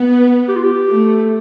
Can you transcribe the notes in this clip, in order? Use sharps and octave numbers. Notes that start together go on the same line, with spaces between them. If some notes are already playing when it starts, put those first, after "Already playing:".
Already playing: B3
G4
F4
G4
A3